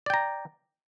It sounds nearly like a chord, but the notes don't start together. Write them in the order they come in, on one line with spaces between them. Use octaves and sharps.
D5 G5 A#5